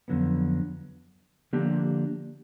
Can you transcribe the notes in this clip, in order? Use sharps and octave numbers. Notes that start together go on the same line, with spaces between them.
F2 D3 F#3 B3
D3 F3 A#3 D4 G4